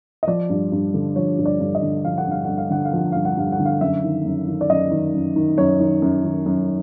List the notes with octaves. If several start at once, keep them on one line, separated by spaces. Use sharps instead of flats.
D#5
F3 D5
G2
G2
D3
F3 C#5
G2
D5
G2
D#5
D3
F3 F5
F#5
G2 F5
G2 F#5
F5
D3 F#5
F5
F3 F#5
G2 F5
F#5
G2 F5
F#5
D3
F5
F#2 E5
D#3
F#2
D#3
D5
F#2 D#5
D#3
F#2
D#3
F#2 C#5
D#3
F#2
D#3
F#2